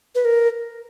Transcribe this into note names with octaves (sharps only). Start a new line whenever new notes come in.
B4
A#4